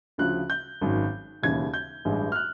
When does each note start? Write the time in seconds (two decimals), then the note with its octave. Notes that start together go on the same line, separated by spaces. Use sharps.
0.18 D2 C#3 F3 F#6
0.50 G6
0.81 G#1 F#2 D#3
1.42 E1 D#2 C#3 E3 G#6
1.74 G6
2.05 A1 G2 E3 G#3
2.32 F6
2.36 F#6